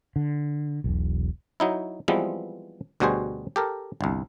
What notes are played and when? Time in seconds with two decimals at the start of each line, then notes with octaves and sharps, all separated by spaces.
0.16 D3
0.84 E1 B1
1.60 F#3 D#4 E4
2.08 E3 F3 G3 G#3 B3 C4
3.00 D2 B2 G3 F#4 G#4 C5
3.56 G4 A4 A#4
4.01 G1 C2